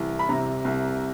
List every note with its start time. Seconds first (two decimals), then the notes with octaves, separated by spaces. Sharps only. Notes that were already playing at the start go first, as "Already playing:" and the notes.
Already playing: C2 E3
0.19 B5
0.29 C3 A#5
0.65 C2